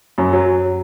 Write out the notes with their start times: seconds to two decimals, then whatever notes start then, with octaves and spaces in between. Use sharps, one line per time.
0.18 F#2
0.33 F#3